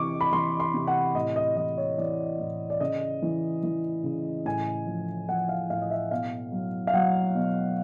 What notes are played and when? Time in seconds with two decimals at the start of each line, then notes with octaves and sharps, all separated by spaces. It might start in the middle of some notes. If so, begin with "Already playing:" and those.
Already playing: C3 E3 C#6 D6
0.21 B5
0.32 E3 C6
0.60 C6
0.74 C3
0.87 F#5
1.15 A2 D#5
1.36 D#5
1.56 E3 D#5
1.77 C#5
1.98 E3 D5
2.39 A2
2.70 D5
2.80 C#3 D#5
3.22 E3
3.63 E3
4.04 C#3
4.45 A2 G#5
4.87 F3
5.29 F3 F#5
5.49 F5
5.70 A2 F5
5.81 D#5
5.90 E5
6.11 B2 F5
6.52 F#3
6.87 F5
6.94 F#3 F#5
7.35 B2